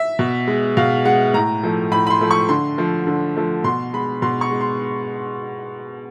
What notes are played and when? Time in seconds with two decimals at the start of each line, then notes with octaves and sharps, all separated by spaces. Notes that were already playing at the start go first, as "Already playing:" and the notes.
Already playing: E5
0.19 B2
0.48 G#3
0.77 B2 F5
1.05 G#3 F#5
1.34 A2 A#5
1.63 F3 A3
1.91 A2 B5
2.07 B5
2.10 C6
2.21 F3 A3
2.31 C#6
2.49 D3 C6
2.78 F3 A3
3.07 D3
3.36 F3 A3
3.64 B2 C6
3.93 G#3 B5
4.22 B2 C6
4.41 C#6
4.51 G#3
4.61 C6